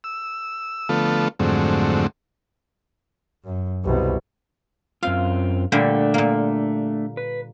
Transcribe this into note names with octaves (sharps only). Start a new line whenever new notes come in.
E6
D3 F3 A3 B3 F4 A4
F2 G#2 D3 F#3 A3 C4
F#2
C2 B2
F#2 C4 F4 F5
A#2 D3 G3 A3 D4 A4
A#2 A#3
B4